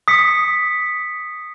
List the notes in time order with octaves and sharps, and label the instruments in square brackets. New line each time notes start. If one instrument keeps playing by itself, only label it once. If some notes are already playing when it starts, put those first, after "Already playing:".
[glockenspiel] D#6 B6 C#7